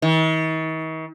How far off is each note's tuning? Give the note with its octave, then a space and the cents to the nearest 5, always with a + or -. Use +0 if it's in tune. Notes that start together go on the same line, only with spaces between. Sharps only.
D#3 +45